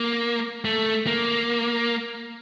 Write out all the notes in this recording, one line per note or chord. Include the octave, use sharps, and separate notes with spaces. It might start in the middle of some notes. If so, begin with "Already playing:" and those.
Already playing: A#3
A3
A#3